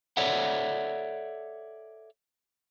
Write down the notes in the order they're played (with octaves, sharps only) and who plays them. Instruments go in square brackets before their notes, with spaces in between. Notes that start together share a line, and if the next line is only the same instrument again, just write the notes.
[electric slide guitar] A4 C#5 D5 E5 F#5